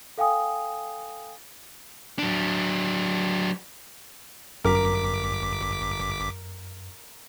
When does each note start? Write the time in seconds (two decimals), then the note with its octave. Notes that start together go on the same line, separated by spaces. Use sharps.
0.18 A4 F5 G5 G#5 D#6
2.19 F#3 D4
4.64 G1 F#2 A#4 D6 B6